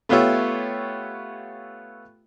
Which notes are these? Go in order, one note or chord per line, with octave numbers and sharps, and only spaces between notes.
A3 B3 F4 G4 C#5 E5